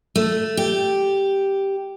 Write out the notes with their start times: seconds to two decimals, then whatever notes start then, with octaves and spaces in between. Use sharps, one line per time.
0.16 A3
0.57 G4